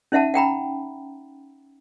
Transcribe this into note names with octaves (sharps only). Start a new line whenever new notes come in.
C#4 D#4 E5 F#5 A5
F#5 G5 A#5 B5